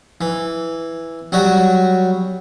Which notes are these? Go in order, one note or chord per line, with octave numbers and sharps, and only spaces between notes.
E3
F#3 G3 F#4